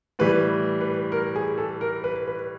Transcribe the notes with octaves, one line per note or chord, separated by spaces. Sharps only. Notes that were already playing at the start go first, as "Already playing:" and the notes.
A2 E3 G3 B4
B4
A#4
G#4
A4
A#4
B4
B4